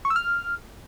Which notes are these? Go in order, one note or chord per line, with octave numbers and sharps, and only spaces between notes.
C#6
E6
F6